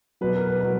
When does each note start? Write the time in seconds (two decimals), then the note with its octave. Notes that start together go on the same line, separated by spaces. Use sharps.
0.21 B2 F#3 B4
0.35 A#4
0.48 B4
0.61 B2 F#3 B4